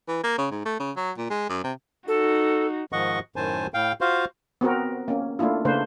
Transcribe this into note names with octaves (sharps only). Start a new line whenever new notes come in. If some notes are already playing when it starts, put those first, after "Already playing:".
E3
A#3
C#3
G#2
A3
C#3
F#3
A#2
G#3
F#2
C3
D#4 F#4 A4
G#2 D#3 F3 D#5 F#5 C#6
F#2 A2 D#3 C5 G#5 A5
A2 F5 G5
F4 F#4 C5 F5
B3 C4 F#4 A#4
A#3 C#4
A3 A#3 D4 E4 F4
C#3 A3 A#3 D4 B4 C5